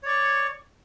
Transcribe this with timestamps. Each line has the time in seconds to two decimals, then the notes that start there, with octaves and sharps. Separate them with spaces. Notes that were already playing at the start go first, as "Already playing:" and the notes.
0.03 C#5
0.05 D5
0.08 C#6